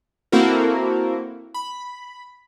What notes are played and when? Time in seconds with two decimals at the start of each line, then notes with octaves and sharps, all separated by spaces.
0.32 A#3 C4 E4 F#4 A4 A#4
1.54 B5